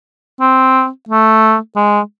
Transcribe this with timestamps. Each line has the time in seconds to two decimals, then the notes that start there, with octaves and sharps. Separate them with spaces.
0.40 C4
1.09 A3
1.76 G#3